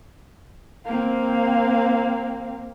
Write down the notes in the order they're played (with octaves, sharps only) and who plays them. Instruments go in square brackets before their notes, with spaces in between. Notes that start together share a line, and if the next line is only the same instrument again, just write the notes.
[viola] A#3 [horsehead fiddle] C4 F5